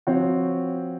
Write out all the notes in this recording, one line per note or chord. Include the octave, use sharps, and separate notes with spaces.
F3 C4 F#4 C#5